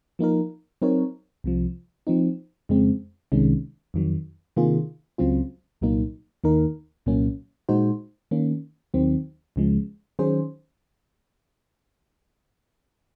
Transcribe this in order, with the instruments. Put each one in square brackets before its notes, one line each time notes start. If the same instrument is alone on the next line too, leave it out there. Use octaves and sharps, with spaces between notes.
[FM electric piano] F3 A#3 D#4 A#4
F#3 C4 D#4 A#4 C#5
C2 C3 F3
F3 C4 D#4
F2 C#3 G#3 C4
C2 C3 D#3 G#3 C#4
F2 D#3 F#3
C3 D#3 A#3 F4 G#4
C#2 C#3 F#3 C4 F4
C2 A#2 F#3 A#3 D#4
D#2 D#3 A#3 D#4 A#4
C2 A#2 F#3 A#3 C#4
A#2 G#3 D#4 F#4 C5
D#3 A#3 C#4
D#2 D#3 F#3 C4
C#2 C#3 F3 G#3
D#3 F#3 C#4 G#4 C5